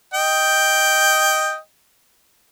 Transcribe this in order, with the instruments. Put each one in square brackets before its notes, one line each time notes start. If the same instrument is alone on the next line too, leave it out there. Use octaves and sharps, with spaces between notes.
[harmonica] D#5 G5